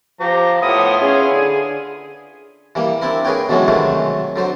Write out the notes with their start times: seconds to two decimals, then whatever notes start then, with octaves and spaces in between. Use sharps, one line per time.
0.20 F3 G4 C5 A#5
0.62 A2 B3 E4 F4 D#6
1.01 C#4 G#4
1.32 D3
2.75 E3 G3 A#3
3.02 C4 D4 E4 A#4
3.25 G#4 A#4 B4 C#5 G5
3.49 B2 D3 E3 F#3 G#3 C#4
3.68 C3 D#3 F#3 G#3 A3
4.36 D3 F#3 C5